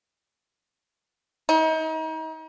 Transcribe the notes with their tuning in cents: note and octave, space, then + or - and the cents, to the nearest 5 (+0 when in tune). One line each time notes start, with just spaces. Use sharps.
D#4 +35